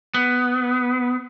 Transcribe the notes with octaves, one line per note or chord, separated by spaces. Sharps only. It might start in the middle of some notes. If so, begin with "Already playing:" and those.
B3